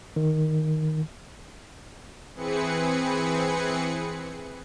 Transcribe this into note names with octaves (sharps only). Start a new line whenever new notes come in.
D#3
E3 C4 G#4 B4 C#7